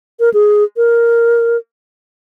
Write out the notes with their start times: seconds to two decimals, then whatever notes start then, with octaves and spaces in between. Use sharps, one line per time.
0.20 A#4
0.34 G#4
0.77 A#4